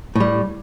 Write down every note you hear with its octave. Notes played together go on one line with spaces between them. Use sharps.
A2 G3